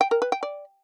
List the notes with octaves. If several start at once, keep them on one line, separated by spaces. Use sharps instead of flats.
G5
A#4
B4
G5
D5